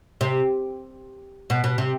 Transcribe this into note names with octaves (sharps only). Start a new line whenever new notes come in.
C3
B2
B2
C3